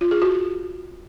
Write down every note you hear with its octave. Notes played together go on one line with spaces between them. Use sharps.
F4
G#4
F#4